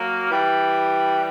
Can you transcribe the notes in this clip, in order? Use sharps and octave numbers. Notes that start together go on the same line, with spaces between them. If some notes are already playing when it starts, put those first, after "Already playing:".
Already playing: F#3 A#3
E3 G3